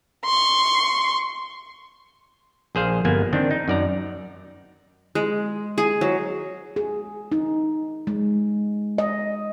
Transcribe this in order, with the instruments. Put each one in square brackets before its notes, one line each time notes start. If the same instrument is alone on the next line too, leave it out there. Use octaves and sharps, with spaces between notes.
[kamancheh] C6 C#6
[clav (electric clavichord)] A#1 G#4 C5 F5
G1 F3 A#3 B3 G#5
D#3 C4 D4
D#4
F#2 D5 A#5
[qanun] G#3
G#4
F#3
[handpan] G#4
D#4
G#3
D#5